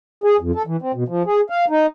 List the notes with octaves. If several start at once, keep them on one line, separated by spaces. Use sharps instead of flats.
G#4
F2
A4
E3
C4
B2
F3
G#4
F5
D#4